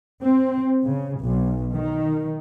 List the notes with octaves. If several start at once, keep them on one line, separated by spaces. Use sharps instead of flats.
C4
C#3
B1
D#3